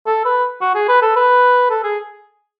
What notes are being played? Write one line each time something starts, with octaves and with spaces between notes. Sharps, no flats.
A4
B4
F#4
G#4
B4
A4
B4
A4
G#4